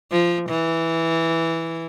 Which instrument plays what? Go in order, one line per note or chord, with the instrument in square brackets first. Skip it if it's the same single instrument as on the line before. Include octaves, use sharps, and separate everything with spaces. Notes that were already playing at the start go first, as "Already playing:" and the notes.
[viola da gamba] F3
E3